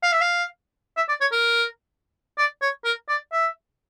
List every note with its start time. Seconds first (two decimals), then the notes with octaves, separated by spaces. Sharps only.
0.03 F5
0.12 E5
0.21 F5
0.97 E5
1.09 D5
1.21 C#5
1.32 A#4
2.38 D5
2.62 C#5
2.85 A#4
3.09 D5
3.33 E5